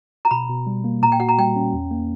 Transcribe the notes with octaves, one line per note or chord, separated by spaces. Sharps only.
A#5
B2 B5
B2
G3
A#3
A#2 A#5
G5
F#4 F#5
A#5
G3 G5
C#4
E2
A#3